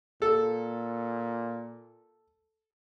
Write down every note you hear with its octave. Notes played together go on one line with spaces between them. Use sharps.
A#2 A4